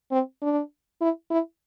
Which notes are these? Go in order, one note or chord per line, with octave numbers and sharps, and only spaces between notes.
C4
D4
E4
E4